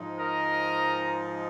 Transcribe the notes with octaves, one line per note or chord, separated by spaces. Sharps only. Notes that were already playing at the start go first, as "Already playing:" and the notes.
Already playing: G#2 F3 G#3 D#4
A#4 D#5